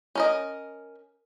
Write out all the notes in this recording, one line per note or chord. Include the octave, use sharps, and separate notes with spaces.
C#4 A#4 D#5